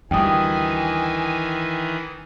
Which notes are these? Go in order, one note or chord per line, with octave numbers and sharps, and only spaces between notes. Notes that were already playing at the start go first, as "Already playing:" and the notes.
D2 D#3 E3 G3 G5 G#5 D#6